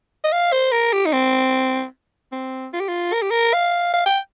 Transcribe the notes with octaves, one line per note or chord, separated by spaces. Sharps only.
D#5
F5
C5
A#4
G4
D#4
C4
C4
F4
G4
F4
A#4
G4
A#4
F5
F5
G5